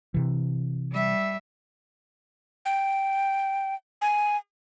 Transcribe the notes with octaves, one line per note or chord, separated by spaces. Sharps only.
C3 E3
G3 E5
G5
G#5